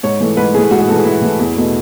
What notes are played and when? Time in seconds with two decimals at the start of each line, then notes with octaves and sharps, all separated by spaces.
0.03 G#2 C#5
0.20 E3 A3
0.37 G#2 B4
0.54 E3 A3 G#4
0.71 G#2 F#4
0.80 G#4
0.88 A3 A4
0.91 E3
0.97 G#4
1.05 G#2 E4
1.22 E3 A3
1.39 E2
1.56 B2 A3